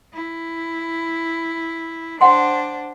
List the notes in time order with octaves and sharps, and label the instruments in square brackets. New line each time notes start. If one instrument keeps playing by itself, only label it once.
[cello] E4
[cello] D4 C5 [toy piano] F#5 G5 C6